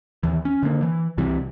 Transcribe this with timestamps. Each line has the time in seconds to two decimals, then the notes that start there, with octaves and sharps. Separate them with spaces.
0.23 D#2 E3
0.45 C#4
0.63 D3 A#3
0.83 E3
1.18 C2 C3 E3 G3